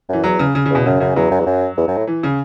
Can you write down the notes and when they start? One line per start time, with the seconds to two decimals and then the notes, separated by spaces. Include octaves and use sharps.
0.09 F#2 E3
0.24 E2 F#3
0.39 C#3
0.55 C#3
0.66 C#3
0.70 E2 B2
0.86 F#2 C#3
1.00 F#2 C#3
1.16 E2 F#3
1.31 F#2
1.40 E2
1.46 F#2
1.77 E2
1.88 F#2
1.97 A2
2.07 E3
2.23 C#3